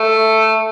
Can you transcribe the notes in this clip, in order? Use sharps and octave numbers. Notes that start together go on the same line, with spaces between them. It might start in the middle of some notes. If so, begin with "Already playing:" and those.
Already playing: A3